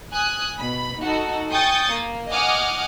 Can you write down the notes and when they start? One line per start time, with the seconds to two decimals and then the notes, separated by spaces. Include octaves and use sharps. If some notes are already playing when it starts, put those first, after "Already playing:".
0.12 G#5 D#6 F#6
0.59 B2 B5
1.00 D#4 F#4 A4
1.49 G5 G#5 C#6 D#6 G6 A6
1.91 A#3
2.29 D#5 F#5 G#5 D6 D#6 F6